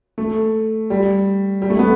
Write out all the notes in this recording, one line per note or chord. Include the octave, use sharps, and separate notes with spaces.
A3
G3
G3
A3
B3